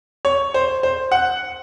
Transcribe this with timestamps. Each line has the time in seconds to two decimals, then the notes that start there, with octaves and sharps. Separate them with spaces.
0.25 C#5
0.54 C5
0.83 C5
1.12 F#5